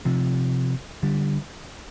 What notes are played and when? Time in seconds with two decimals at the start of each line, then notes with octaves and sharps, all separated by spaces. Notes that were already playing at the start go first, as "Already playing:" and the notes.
0.05 C3 F3
1.03 D3 G3